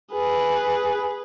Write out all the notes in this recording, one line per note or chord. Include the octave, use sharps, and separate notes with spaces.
G#4 B4